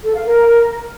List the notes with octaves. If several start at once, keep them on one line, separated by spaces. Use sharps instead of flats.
A4
F5
A#4